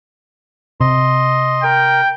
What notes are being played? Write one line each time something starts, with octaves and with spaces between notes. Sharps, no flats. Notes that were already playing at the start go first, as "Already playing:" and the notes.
C3 D#5 C6
A#4 G5